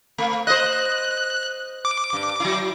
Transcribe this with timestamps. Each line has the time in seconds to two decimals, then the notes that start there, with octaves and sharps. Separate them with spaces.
0.18 A3
0.47 C5 D#5 F#6
1.85 D6
2.13 G2
2.40 F#3 E4